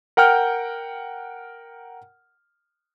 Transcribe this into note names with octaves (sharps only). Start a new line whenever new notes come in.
A#4 F#5 G5 F6 G6